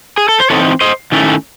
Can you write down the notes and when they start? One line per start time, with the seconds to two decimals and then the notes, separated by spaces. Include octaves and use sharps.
0.18 G#4
0.29 A4
0.40 C5
0.50 E3 C4 D#4 A4 C#5
0.81 C5 D#5
1.12 D#3 A3 C#4 E4